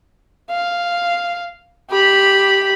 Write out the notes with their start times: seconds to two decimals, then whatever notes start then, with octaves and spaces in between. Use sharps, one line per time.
0.50 F5
1.90 G4 B5